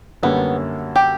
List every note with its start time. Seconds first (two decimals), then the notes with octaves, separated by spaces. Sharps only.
0.23 F#2 D3 G3 A#3 B3 C#4
0.96 G4